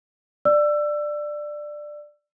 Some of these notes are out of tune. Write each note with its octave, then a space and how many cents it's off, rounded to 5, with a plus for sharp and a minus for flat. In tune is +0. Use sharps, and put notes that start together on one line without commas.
D5 +15 E6 +25